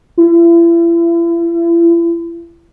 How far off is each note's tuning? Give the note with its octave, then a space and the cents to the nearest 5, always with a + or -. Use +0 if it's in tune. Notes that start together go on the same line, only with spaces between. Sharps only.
E4 +40